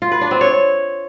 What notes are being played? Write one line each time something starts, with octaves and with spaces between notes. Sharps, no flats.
F4
B4
D4
C4
C#5